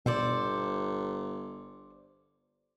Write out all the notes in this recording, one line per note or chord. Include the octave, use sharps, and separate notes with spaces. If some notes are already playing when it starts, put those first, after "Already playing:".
G1 B2 A4 C5 D5